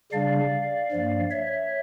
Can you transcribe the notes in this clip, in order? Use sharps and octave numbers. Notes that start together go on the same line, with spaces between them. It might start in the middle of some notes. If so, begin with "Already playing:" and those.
C#3 G3 D4 D5 F5
G2 F3 A#3
C#5 E5